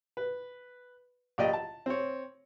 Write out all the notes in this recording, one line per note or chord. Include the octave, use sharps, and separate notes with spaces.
B4
A#1 G4 D5 D#5
A5
C4 C#5